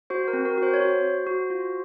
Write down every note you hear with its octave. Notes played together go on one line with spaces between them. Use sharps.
F#4 C5
A#4
C4
A#4
F#4
C5
C#5
F#4 C5
F#4
F#4
F4